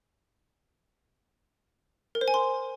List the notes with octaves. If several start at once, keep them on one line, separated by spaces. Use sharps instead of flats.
A#4
C5
G#5
C6